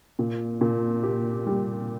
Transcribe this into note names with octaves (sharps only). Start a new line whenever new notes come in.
A#2
A#2
G4
G3